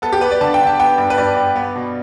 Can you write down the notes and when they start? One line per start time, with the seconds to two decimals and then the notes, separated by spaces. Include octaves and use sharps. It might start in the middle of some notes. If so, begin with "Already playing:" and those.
0.02 B3 A4
0.13 G4
0.21 B3 B4
0.31 D5
0.41 D3 A5
0.54 G5
0.60 D3
0.67 A5
0.79 B3 G5
0.98 G2
1.10 B4
1.18 G2 D5
1.36 G2
1.56 B3
1.76 B2